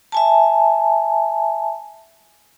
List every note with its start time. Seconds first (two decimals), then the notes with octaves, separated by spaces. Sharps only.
0.12 E5 G#5 A5